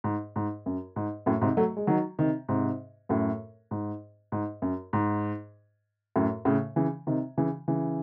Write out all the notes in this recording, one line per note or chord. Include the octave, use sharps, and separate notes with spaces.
G#2
G#2
F#2
G#2
F#2 A2
G#2 C3
F#3 A3
G#3
D#3 F#3
C3 D#3
G#2 C3
F#2 A2
G#2
G#2
F#2
G#2
F#2 A2
A2 C#3
C#3 E3
C3 D#3
C#3 E3
C#3 E3